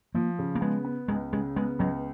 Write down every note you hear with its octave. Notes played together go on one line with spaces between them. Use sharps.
F3 A#3
C#3
A#3
G#3 B3
B3
C#2 G#3
C#3 G#3
G#3 B3
C#2 F#3